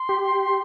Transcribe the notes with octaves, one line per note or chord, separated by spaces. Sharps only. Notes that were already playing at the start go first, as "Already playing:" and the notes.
Already playing: C6
G4